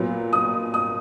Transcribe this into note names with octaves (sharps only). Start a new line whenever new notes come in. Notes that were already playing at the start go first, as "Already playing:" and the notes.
Already playing: A#2 F#3 B3
D#6
D#6